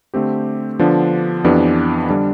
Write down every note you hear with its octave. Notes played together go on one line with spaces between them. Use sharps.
D3 A3 C4 G4
D3 F3 B3 D4
F2 E3 B3 D4 G4
D3 G3 D4